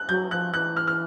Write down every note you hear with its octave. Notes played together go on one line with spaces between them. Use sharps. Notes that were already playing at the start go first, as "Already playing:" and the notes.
Already playing: F#6
F#3 G6
F3 F#6
E3 F#6
F6
F6